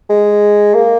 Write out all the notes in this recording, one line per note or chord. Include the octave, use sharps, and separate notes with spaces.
G#3
A#3